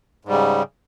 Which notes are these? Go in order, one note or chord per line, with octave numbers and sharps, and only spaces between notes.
G#2 C#3 G3